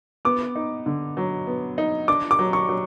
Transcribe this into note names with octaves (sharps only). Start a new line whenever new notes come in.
B3 D6
D#4
D3
F#3
B3
D#4
D4 D6
D6
F#3
C#6
F#3